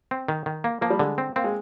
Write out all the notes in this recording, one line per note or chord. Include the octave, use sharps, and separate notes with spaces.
C4
D#3
D#3
A#3
F3 A#3
G3
D3 G#3
C4
A#3 C4
G#3